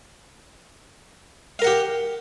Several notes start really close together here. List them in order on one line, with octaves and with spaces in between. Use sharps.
F5 A#4 F#5 G4